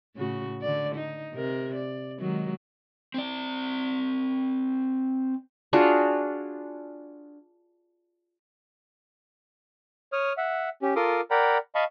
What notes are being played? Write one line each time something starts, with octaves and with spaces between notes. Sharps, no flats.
A2 C#3 F#4
D3 D5
D#4
C3 A#4
D5
D#3 F#3 G#3
C4 D5
D4 F4 F#4 G#4
C#5 D#6 F6
E5 F#5
C#4 G4
F4 A4 A#4 C6 D6 D#6
A#4 D5 F#5 G5 A#5 B5
D#5 F5 A5 B5 C#6